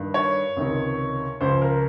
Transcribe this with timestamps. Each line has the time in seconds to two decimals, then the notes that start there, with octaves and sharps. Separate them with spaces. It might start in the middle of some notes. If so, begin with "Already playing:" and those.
Already playing: G2 D#3
0.14 C#5
0.56 C#2 C3 D#3
1.41 C#2 C#3 F3 C5
1.62 A#4